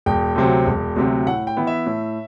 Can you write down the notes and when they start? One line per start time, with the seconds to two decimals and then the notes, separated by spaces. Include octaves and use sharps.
0.06 E1 G5
0.36 D2 C3 F#3 C4
0.67 E1
0.96 D2 C3 F#3 C4
1.27 A2 F#5
1.47 G5
1.57 E3 B3 E4
1.67 E5
1.86 A2